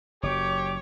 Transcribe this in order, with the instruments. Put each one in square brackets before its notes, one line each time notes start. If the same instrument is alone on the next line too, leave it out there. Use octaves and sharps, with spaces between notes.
[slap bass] F#1 F#3 [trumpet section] G4 D6 [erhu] C#5